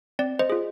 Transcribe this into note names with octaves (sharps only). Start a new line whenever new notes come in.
C4 D5
C5 D#5
F4 G#4